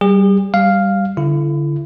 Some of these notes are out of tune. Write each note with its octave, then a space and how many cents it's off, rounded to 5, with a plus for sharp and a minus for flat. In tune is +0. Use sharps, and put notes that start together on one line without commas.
G3 -15 G#4 -45
G3 +0 F5 +0
D3 -20 E4 +30